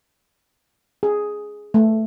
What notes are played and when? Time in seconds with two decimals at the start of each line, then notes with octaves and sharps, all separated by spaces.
1.03 G#4
1.74 A3